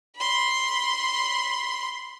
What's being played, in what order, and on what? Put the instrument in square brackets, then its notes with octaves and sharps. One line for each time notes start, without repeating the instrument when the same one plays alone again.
[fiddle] B5 C6